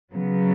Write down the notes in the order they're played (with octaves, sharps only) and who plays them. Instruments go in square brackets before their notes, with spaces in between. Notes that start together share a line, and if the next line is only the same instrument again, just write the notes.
[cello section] C#3 F#3 B3